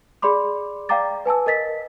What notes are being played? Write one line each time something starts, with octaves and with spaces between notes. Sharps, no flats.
G#4 D5 B5 C6 D6
D5 F5 G5 A#5 D6 A6
B4 G#5 A5 E6
A#4 D#5 A6 B6